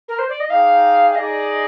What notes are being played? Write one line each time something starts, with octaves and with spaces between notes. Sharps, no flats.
A#4
C5
D5
D#5
D#4 G#4 D5 F5 G5
F5
D#4 G#4 D5 D#5